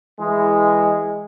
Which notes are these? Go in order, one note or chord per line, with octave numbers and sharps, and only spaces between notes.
E3 G#3